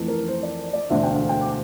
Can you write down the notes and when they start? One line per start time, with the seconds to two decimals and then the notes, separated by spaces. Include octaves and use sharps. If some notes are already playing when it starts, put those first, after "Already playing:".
Already playing: F2 E3 A3
0.08 A#4
0.28 C5
0.43 D5
0.73 D5
0.89 E1 D2 D3 A3 E5
1.03 G5
1.10 F5
1.29 G5
1.41 D6